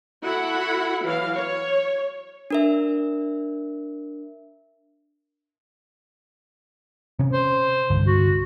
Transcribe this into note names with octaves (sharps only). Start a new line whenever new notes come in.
E4 F#4 A4 F#5 B5
E3 F#3 F5
C#5
D4 A#4 E5
C3 C#4
C5
C2 G2 D3
F#4